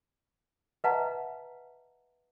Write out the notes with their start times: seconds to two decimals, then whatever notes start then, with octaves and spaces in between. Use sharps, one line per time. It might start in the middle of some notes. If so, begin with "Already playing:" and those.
0.84 B4 D#5 E5 F#5 A5 A#5